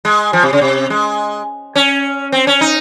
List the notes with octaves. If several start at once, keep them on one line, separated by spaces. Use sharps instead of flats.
G#3
F3
C3
C#3
C3
G#3
C#4
C4
C#4
D#4